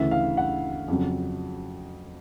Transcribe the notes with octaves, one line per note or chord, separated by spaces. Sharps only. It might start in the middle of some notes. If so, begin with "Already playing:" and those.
Already playing: D2 C#3 E3 E5
F5
F#5
F2 C#3 F#3